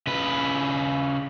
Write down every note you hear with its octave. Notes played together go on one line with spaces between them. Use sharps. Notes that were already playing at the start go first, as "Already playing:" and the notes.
C#3 B4